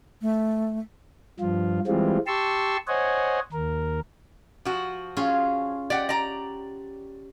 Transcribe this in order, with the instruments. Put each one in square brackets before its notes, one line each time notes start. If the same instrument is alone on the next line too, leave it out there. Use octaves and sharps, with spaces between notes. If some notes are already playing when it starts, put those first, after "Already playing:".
[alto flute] A3
[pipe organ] G2 F3 F4
E3 G3 G#3 C4 F4
G4 A5 C6 C#6 E6
C5 C#5 D#5 F#5 G#5
D#2 A#4
[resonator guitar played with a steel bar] F3 F#4
[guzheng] C#4 F4 G#4
[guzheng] G4 [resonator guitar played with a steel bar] D5 F#5
[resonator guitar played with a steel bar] D5 A#5